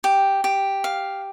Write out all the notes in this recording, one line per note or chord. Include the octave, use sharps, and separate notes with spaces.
G4
G4
F5